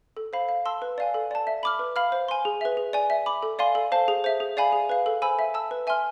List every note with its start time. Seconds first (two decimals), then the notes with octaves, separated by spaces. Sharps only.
0.17 A4
0.33 C5 F5 B5
0.49 F5
0.65 A5 C6 E6
0.82 B4
0.98 D5 F5 G#5
1.14 A4
1.31 D5 A5
1.47 E5
1.63 B5 D6 F6
1.79 B4
1.96 F5 B5 F6
2.12 C5
2.29 G#5 C6
2.45 G#4
2.61 B4 E5
2.77 G#4
2.93 D5 G#5
3.10 E5
3.26 B5 D6
3.43 A4
3.59 D5 F5 G#5 C6
3.75 A4
3.92 C5 F5 A5
4.08 G#4
4.24 C5 E5
4.40 G#4
4.57 D5 F5 G#5 B5
4.72 G#4
4.89 B4 F5
5.06 A4
5.22 C5 G#5 B5 E6
5.39 E5
5.54 A5 E6
5.71 B4
5.87 E5 G#5 C6 F6